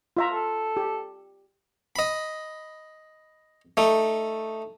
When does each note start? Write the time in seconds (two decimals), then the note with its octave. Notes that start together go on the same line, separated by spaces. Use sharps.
0.17 F4 E5 A#5
0.32 A4
0.77 G4
1.96 D#5 B5
3.77 A3 D#4